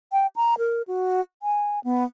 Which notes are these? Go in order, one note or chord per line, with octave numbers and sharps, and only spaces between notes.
G5
A#5
A#4
F#4
G#5
B3